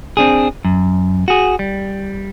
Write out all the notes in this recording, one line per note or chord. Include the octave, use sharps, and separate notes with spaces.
C4 D4 G#4
F#2
F#4 G#4
G3